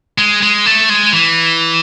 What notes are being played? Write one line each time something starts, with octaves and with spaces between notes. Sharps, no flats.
G#3
G#3
A3
G#3
E3